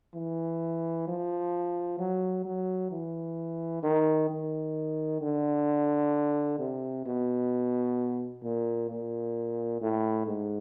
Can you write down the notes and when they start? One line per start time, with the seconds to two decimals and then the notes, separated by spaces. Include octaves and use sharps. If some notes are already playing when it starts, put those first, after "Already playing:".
0.15 E3
1.08 F3
1.99 F#3
2.45 F#3
2.91 E3
3.83 D#3
4.30 D#3
5.21 D3
6.59 C3
7.06 B2
8.43 A#2
8.90 A#2
9.81 A2
10.27 G#2